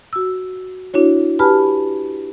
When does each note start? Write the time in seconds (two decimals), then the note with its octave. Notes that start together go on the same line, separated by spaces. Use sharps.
0.13 F#4 E6
0.94 D4 E4 F#4 C#5
1.39 G4 B4 G#5 A5 B5 F6